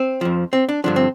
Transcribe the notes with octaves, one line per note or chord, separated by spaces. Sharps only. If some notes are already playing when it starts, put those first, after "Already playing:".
Already playing: C4
F2 F3
C4
D4
G2 D3 F3 D4
C4